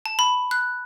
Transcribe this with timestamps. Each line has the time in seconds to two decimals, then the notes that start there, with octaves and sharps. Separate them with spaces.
0.06 A5
0.19 B5
0.51 F#6